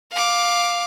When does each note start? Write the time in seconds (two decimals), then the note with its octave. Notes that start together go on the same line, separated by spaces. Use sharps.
0.12 F5 D6